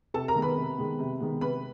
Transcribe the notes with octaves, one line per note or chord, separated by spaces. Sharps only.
C3 A4 A5
A#4 A#5
D#3 G#3 B3
B4 B5
C3
D#3 G#3 B3
C3
D#3 G#3 B3
C3 B4 B5